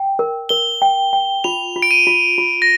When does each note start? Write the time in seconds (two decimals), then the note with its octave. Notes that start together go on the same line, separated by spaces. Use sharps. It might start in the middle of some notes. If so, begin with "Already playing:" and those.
Already playing: G5
0.19 A#4
0.49 A#4 G7
0.82 G5
1.13 G5
1.44 F4 F7
1.76 F4
1.82 D7
1.91 D#7
2.07 F4
2.38 F4
2.62 A#6